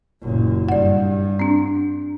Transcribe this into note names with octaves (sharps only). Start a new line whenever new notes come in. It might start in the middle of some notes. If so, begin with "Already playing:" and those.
F#1 A#2
G2 D5 F#5
C4 D4